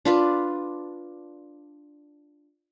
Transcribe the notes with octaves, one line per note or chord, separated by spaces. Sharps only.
D4 F4 B4